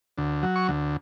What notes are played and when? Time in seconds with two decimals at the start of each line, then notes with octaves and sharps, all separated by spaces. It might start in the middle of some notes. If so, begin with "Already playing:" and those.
0.18 D2
0.43 F#3
0.56 C#6
0.69 D2